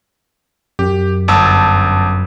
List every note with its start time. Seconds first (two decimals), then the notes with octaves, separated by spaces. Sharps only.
0.79 F#2 G4
1.28 G1 A5 E6